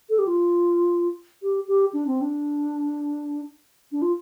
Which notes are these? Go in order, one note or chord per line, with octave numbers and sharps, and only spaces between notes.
A4
G4
F4
G4
G4
D4
C4
D4
D4
F4